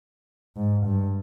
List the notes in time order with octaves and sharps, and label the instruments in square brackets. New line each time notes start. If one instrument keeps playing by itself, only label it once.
[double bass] G#2
G2